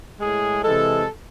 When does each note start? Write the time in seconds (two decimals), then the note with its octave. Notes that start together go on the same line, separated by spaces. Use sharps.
0.20 A2 G#3 G#4
0.63 C3 E3 G#3 A4